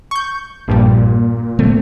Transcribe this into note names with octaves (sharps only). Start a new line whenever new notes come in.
C#6 G6
A#1 G2 A#2 G3
D3 A3 C4